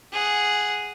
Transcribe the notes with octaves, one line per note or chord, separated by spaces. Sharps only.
G#4 F#5